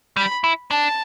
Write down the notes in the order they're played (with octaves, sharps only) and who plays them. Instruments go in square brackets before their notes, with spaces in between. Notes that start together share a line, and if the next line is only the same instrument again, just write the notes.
[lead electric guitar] G3 [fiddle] B5
[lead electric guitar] E4
[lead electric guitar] D4 [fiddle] A5